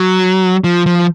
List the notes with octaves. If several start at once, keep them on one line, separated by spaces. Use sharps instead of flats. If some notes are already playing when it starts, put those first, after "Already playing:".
Already playing: F#3
F3
F3